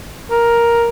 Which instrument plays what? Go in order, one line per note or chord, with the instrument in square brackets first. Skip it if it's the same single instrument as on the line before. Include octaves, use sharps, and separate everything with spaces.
[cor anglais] A#4